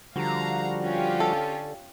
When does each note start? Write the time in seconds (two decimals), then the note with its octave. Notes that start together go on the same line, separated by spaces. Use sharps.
0.16 D3 F3 G3 F#4 F5 A#5
0.82 C#4 F4 G4
1.20 A4